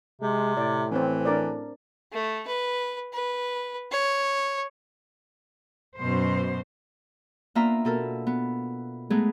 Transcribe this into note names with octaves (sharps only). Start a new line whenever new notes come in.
C3 G#3
A2 D5
E3 C4 C#4
D4 A#4 D5
A3
B4
B4
C#5
F#2 B2 C5
A#3 B3 D4 F4 E5 A#5
B2 A4 A#4
B3
G#3 A3 B3 D#4 G#4